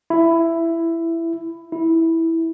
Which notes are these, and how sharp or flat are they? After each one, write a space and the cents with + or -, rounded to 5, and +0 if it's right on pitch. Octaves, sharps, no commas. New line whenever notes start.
E4 +10
E4 -10